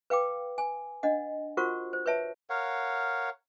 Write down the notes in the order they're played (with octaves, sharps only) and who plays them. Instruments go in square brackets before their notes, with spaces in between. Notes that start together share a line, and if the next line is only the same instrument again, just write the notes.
[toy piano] B4 F5 G5 D6
G#5
D4 D#5 F#5
F4 F#4 A#4 C5 F#5 C#6
C5
B4 C#5 E5 A5
[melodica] A#4 C#5 F5 F#5